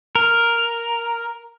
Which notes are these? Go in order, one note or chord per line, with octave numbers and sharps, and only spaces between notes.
A#4